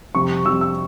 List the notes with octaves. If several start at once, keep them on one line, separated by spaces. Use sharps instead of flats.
F2 C3 G3 C4 C#6
F2 C3 G3 C4 E6
E6